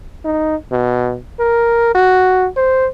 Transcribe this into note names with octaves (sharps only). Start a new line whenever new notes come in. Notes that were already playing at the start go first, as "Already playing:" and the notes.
D#4
B2
A#4
F#4
C5